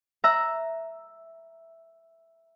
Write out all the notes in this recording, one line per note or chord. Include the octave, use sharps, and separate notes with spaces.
E5 A#5 E6 F#6